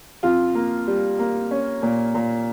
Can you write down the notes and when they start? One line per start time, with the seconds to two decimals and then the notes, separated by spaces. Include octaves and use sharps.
0.23 F2 F4
0.55 A#3
0.87 G3
1.19 A#3
1.51 C#4
1.82 A#2
2.15 A#2